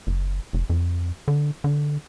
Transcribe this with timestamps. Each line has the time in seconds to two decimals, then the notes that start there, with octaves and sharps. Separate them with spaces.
0.07 F#1
0.53 F1
0.70 F2
1.28 D3
1.64 D3